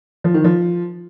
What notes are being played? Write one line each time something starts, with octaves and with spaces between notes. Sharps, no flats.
F3
D#3
F3